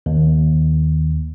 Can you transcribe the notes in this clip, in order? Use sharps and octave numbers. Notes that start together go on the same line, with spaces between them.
D#2